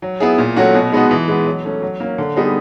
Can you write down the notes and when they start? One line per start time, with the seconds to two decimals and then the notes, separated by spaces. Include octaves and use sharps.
0.02 F#3
0.20 B3 E4 G#4
0.38 A#2
0.57 F#3 A3 C#4 F#4
0.74 B2
0.92 G#3 B3 D#4 F#4
1.11 E3
1.28 G#3 B3
1.46 F#3
1.64 A3 C#4
1.82 F#3
2.00 A#3 C#4
2.18 D3
2.36 G3 B3 D#4 G#4